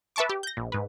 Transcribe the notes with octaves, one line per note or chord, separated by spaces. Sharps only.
B4 E5 A5 C#6 D6
G4
G6 A#6
A#1
G#2 B4